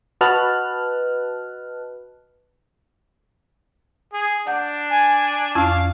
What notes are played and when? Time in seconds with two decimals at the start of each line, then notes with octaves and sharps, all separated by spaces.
0.21 F#4 B4 D#5 A5 F6 F#6
4.13 G#4
4.47 D4 F#5 G6
4.90 G#5 G#6
5.55 F2 C#4 E4 F5